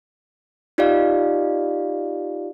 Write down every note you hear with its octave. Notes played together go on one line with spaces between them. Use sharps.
D#4 F4 G4 D5 D#5 F5